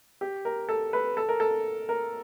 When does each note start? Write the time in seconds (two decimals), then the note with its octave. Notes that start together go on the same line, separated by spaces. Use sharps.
0.21 G4
0.45 A#4
0.69 A4
0.93 B4
1.17 A4
1.29 A#4
1.40 A4
1.89 A#4